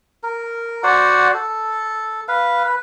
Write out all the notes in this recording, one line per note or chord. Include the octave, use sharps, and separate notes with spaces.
A#4
F#4 C5 D5 F#5
A4
B4 F5
B4